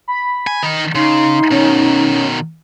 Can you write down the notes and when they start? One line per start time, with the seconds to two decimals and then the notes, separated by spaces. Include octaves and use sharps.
0.08 B5
0.47 G#5
0.63 D#3 D#4
0.95 C#3 D#4 C6
1.51 B2 D#3 C#4